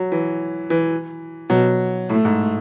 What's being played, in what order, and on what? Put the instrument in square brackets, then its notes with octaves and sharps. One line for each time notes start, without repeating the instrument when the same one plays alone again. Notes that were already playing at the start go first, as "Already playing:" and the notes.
Already playing: [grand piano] F#3
E3
E3
[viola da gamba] B2 [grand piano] F#3
[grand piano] A2 [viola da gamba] A3
[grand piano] G#2